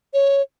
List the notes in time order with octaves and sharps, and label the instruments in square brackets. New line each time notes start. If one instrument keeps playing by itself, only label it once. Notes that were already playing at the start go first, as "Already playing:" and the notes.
[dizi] C#5